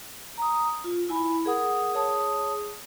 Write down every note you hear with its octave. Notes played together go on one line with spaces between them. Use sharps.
A#5 D#6
F4
E4 G#5 B5
G#4 A#4 F#5 D#6
G#4 C#5 A5 D#6